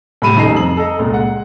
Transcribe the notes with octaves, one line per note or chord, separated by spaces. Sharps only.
A2 G3 B5 D#7 E7
D#1 C#3 D#4 G#4 A#5 C7
F2 F#7
A4 D#5 A#5
C#2 A#2
G#3 F#5